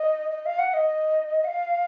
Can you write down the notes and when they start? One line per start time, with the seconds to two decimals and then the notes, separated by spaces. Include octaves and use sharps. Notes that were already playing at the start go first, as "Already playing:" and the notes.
Already playing: D#5
0.31 D#5
0.46 F5
0.59 F#5
0.74 D#5
1.44 F#5
1.48 F5